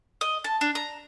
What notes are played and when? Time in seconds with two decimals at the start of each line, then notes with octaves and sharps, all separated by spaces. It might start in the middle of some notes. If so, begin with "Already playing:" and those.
0.21 D#5
0.44 A5
0.61 D4
0.75 A#5